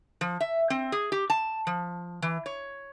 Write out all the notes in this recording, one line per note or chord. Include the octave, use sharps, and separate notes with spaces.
F3
E5
C4
G#4
G4
A5
F3
E3
C#5